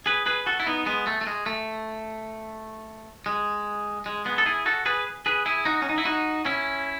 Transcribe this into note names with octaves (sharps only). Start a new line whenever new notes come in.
G#4 B4
G#4 B4
F#4 A4
E4
B3 D#4
G#3 B3
A3
A3
G#3
A3
G#3
G#3
G#3 B3
A4
E4 G#4
F#4 A4
G#4 B4
G#4 B4
E4 G#4
D#4 F#4
C#4
D#4
E4
D#4 F#4
C#4 E4